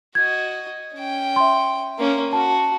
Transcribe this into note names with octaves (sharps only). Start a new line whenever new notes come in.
F#4 D#5 G#6
C#4 G5
E5 C6
A#3 C#4
F#4 A5